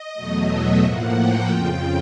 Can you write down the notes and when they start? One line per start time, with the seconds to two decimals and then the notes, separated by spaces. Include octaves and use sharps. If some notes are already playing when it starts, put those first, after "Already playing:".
Already playing: D#5
0.14 E2 B2 F#3 A3
0.48 E5
0.81 A2 F3 A#3 F#5
1.14 G5
1.48 F2 C#3 F3 G5